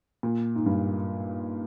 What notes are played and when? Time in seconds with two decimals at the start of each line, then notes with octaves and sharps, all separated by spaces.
0.23 A#2
0.55 G#2
0.66 G2